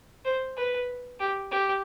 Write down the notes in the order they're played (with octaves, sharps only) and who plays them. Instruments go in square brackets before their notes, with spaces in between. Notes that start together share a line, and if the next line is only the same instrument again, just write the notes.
[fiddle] C5
B4
G4
G4